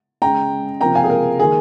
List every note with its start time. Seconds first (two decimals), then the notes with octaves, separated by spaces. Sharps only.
0.22 C#3 G#3 G5 A#5
0.81 C3 F3 A#3 G5 A#5
0.95 F5 G#5
1.04 G#4
1.10 A#4
1.39 D#3 A#3 G#4